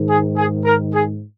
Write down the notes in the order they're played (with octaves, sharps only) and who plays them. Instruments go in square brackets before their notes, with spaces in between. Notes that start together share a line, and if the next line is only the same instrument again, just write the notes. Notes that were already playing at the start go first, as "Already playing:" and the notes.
Already playing: [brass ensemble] G#2 D#3
G#4
G#4
A#4
G#4